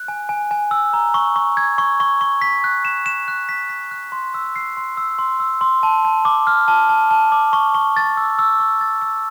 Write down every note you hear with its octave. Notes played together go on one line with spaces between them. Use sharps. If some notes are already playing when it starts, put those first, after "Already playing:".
Already playing: F#6
G#5
G#5
G#5
E6
A#5
C#6
C#6
G#6
C#6
C#6
C#6
B6
F#6
E7
E7
F#6
B6
B6
F#6
C6
E6
C7
C6
E6
C6
E6
C6
A5
A5
D6
F6
A5
A5
A5
D6
C#6
C#6
A6
E6
E6
C#6
A6
E6